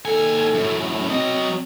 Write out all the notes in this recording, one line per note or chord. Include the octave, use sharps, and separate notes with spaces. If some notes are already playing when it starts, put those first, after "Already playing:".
D#2 A4 G#5
F#2 A2
F#3 C4 D#5